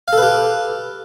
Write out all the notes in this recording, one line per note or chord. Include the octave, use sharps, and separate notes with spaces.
G4 A4 B4 F5